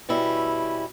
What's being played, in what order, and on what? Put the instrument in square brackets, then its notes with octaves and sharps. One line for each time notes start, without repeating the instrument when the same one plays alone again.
[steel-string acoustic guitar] B2 G3 C#4 E4